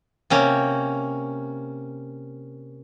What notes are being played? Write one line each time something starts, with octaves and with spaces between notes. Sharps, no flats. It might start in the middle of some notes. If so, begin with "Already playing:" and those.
C3 A#3 C#4